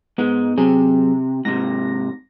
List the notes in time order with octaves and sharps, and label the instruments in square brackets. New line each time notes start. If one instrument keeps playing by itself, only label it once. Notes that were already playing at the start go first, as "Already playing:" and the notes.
[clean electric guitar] G#2 G#3 [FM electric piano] B3
[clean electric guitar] C3 [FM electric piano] F#3 C4 G#4
[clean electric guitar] G#2 C3 [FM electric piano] A#6